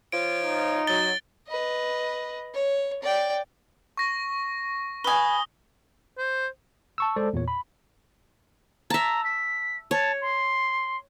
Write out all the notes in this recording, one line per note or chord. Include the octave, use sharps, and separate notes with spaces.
F3 F4 C#5 D7
D#4
F#3 A6 G7
B4 D#5
C#5
D5 G5
C#6 A#6
B4 G#5 D#6 G7
C5
A5 C#6 E6
G#3 A4 C5 D5
E2 A#2 C#5
B5
E5 A5 A#5
B6
C#5 A5
C6